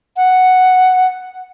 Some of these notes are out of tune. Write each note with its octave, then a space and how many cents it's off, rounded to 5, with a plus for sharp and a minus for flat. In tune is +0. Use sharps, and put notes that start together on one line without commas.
F#5 +0